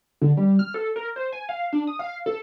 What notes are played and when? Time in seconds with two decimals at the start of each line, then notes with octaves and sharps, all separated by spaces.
0.22 D3
0.37 G3
0.59 F6
0.74 A4
0.96 A#4
1.16 C5
1.32 G#5
1.49 F5
1.73 D4
1.87 D#6
1.99 F5
2.26 A4